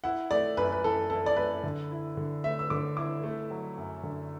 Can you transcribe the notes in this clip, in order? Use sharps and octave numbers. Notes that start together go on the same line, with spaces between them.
E4 F#5
A3 D5
F#2 B4
B4
E3 A4
E4 A4
D5
A3 B4
D3
E4
D3
A3 E5
E6
D3 D6
E4 D6
A3
F#3
F#2
D3